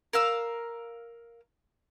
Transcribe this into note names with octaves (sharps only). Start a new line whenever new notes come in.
A#4 F5 E6